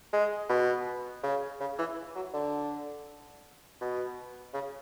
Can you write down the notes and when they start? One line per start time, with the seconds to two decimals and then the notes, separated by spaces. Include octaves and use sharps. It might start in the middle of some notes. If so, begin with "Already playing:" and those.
0.13 G#3
0.49 B2
1.23 C#3
1.60 C#3
1.78 E3
2.15 F#3
2.33 D3
3.81 B2
4.54 C#3